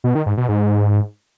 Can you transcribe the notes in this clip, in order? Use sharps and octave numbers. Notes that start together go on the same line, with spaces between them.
B2
D#3
G#2
B2
G#2